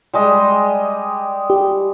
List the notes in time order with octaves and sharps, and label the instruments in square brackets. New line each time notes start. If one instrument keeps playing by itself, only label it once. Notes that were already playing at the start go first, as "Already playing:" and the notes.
[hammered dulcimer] G3 G#3 D#5
[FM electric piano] G4